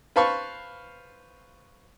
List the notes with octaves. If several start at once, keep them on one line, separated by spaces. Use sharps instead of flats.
B4 C5 F5 A5 B5 C#6